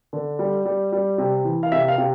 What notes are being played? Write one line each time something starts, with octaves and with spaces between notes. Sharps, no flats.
D3
G3
G3
G3
C3
E3
F5
C3 E5
F5
C3